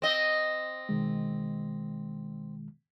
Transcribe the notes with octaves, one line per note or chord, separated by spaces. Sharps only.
C4 D#5
B2 D#3 G#3